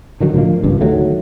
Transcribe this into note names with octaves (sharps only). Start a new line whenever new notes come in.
D3 D#3 F#3
A2 D3 F3 A#3
G#1 C#2 G2
D2 D#3 F#3 A3